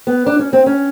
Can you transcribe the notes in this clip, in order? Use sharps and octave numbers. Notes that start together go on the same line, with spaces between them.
B3
D4
C#4
C4
C#4